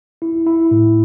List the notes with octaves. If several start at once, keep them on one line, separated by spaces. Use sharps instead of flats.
E4
E4
A2